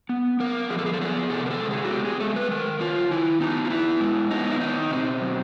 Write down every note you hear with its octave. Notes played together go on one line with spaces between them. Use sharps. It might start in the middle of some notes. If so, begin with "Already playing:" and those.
B3
B3 A#4
F3 G#4
A4
G#4
A4
B3 G#4
C3 A4
A#4
A4
G#3
G#4
F#4
B3 G4
G#4
G#3 A4
B4
D#3 A#4
D#3 F4
D#3 E4
B3 D#4
F4
B3 E4
G#3
B3 D#4
E4
D#3 D#4
B2 C4
F#3